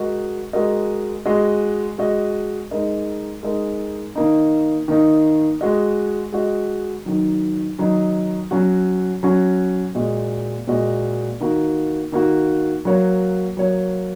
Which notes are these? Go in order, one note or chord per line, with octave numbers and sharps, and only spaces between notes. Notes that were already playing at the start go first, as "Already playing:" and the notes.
Already playing: G#3 F#4 A#4 D#5
G#3 F#4 A#4 D#5
G#3 F#4 D#5
G#3 F#4 D#5
G#3 D#4 A#4 D#5
G#3 D#4 A#4 D#5
D#3 A#3 D#4
D#3 A#3 D#4
G#3 F#4 D#5
G#3 F#4 D#5
D#3 F#3 D#4
D#3 F#3 D#4
F#3 C#4 F#4
F#3 C#4 F#4
A#2 G#3 F#4 D#5
A#2 G#3 F#4 D#5
D#3 A#3 F#4
D#3 A#3 F#4
F#3 A#3 F#4 C#5
F#3 A#3 F#4 C#5